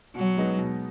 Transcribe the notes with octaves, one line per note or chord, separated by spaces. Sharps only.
B2 F#3
G#3 B3 D#4
B2